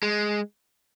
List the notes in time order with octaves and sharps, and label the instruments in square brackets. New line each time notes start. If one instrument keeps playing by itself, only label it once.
[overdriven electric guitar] G#3